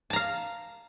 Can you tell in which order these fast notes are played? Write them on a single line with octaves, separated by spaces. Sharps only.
A5 A#5 F5